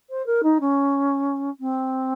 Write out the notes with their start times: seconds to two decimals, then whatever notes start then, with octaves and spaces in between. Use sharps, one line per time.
0.09 C5
0.26 A#4
0.43 D#4
0.60 C#4
1.60 C4